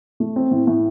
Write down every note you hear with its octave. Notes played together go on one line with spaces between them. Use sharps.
A3
C4
A2
A2